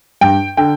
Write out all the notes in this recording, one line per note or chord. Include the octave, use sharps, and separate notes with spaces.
G2 G5
D3 G5